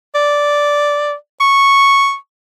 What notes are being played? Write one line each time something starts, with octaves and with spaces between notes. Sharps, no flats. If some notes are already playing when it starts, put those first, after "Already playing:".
D5
C#6